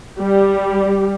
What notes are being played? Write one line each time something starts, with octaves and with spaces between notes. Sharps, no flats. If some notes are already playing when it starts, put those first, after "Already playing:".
G3